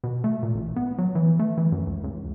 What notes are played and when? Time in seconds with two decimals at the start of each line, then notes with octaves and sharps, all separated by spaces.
0.04 B2
0.24 A3
0.43 A#2
0.55 A1
0.76 B3
0.98 F#3
1.15 E3
1.39 A3
1.58 E3
1.72 F#2
1.87 C#2
2.04 C#2